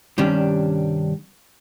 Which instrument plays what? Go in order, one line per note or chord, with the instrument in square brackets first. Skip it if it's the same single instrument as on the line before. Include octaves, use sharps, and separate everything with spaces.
[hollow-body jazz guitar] G2 C3 D#3 G3 C#4 D4